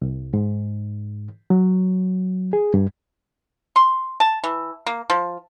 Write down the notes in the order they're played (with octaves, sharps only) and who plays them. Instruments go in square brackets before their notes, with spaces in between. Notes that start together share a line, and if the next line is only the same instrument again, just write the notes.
[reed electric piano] C2
G#2
F#3
G#4
G2
[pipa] C6
A5
E3
A#3
F3